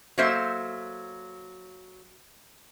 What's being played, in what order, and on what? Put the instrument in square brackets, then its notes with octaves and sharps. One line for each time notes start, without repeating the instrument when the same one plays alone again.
[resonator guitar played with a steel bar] F#3 A#3 A4 C5 E5